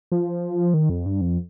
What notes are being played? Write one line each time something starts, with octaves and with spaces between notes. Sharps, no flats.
F3
D#3
F2
G2
F2